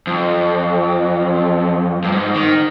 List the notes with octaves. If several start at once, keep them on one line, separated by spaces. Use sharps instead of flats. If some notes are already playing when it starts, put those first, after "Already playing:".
F2
G2
G#2
D#3